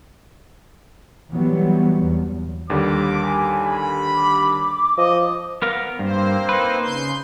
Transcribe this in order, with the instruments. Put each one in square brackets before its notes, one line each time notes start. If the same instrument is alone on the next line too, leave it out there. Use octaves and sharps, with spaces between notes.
[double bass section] E3 F#3 G3 B3 C4
E2
[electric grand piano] D#2 D3 G3 [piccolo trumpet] D6
[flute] G#5
[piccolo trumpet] B5
[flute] D6
[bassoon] F3 [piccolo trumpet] D#5
[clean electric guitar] B3 A#4 F5
[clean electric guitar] G2 [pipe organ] A#3 C4 C5
[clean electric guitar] D#4 B4
[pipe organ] C#3 C6 G6